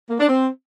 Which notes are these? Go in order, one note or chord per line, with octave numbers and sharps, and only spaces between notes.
A#3
D4
C4